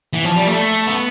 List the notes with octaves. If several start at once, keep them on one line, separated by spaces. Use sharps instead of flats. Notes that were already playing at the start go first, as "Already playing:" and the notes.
E3
F3
G3
A3
B3